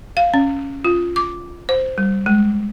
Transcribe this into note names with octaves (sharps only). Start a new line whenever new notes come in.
F5
C#4
F4
D6
C5
G3
G#3